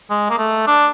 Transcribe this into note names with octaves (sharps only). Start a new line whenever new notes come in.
G#3
A#3
A3
D4